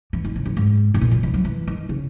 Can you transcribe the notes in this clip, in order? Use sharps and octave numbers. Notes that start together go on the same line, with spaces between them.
E3
D#3
C#3
F#2
G#2
G#2
A#2
C#3
D#3
F#3
E3
D#3
C#3